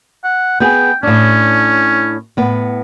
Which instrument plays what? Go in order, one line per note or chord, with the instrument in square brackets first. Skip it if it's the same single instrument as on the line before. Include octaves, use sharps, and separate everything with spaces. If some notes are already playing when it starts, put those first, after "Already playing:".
[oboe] F#5
[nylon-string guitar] B3 G#4 [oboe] G5
[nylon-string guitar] A2 D4 [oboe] C#4
[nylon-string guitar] A2 B3